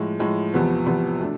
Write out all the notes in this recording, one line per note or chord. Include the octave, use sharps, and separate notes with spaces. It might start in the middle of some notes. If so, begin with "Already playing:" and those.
Already playing: A2 F3 G#3
A2 F3 G#3
E2 C3 F3 B3
E2 C3 F3 B3
B2 A3 D4